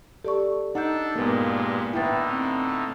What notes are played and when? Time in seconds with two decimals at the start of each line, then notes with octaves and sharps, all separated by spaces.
0.25 G4 A4 D5 C#6
0.75 D4 D#4 A4 F#5 G6
1.16 G2 A#2 G#3 A#3 B3
1.93 A2 D3 D#4 E4 B4 G5 A6
2.31 C4